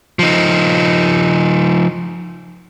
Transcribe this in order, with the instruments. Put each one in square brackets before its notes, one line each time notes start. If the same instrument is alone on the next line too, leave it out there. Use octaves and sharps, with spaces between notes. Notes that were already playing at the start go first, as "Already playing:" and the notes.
[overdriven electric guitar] F3 D#4